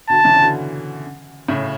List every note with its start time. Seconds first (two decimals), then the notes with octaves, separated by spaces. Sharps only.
0.09 B2 D3 A5
0.25 C#3 E3
0.36 C#3
0.40 B2 D3
1.48 A2 C#3